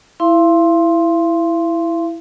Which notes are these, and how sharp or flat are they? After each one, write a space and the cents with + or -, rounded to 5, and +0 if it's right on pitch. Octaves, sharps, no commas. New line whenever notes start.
E4 +0 F5 -40 C6 +5